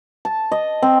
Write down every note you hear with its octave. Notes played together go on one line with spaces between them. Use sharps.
A5
D#5
C4